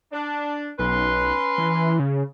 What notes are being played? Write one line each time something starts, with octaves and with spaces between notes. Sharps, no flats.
D4
B1 C#4 B4 C6
E3
C#3